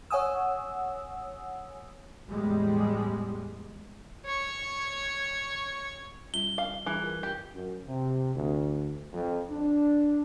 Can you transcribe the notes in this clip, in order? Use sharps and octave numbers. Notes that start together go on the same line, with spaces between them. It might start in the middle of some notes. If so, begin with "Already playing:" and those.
C#5 F#5 G#5 D#6 E6
E2 A2 G3 G#3
C#5 C#6
G3 C#4 F4 G7
F5
E3 G3 G#4 A#5
F4 A#4 G#5
G4
F#2
C3
D2
F2
D4